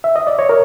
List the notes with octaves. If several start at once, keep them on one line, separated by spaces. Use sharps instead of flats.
E5
D#5
D5
C#5
A#4